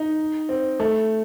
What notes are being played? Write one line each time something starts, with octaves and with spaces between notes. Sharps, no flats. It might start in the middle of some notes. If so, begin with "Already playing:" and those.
Already playing: D#4
C4
A3